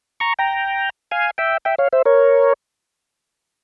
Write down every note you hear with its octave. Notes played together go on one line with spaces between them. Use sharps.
A#5 C#6
G5 A#5
F5 G#5
E5 G5
E5 G5
C#5 F5
C5 E5
A#4 C#5